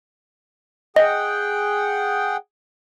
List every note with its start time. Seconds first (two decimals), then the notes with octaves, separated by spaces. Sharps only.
0.96 G#4 D#5 F#5 G5